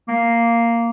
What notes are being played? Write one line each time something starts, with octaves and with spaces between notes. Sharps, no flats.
A#3